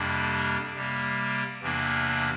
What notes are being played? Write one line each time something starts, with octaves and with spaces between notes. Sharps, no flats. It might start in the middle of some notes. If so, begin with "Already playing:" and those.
Already playing: F2 C3 G3 A#3 D4
C3 G3 A#3
E2 C3 E3 A#3 D4